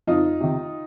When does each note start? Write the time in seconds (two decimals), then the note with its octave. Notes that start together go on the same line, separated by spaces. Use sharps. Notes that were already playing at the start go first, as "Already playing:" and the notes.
0.07 F2 D#4 F4
0.40 C3 D#3